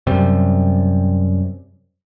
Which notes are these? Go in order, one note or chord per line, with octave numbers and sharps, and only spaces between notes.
F#2 C3 G3